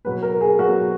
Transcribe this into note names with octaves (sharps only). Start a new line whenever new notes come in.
B2 F#3 B3 B4
A#4
G#4
B2 F#3 B3 F#4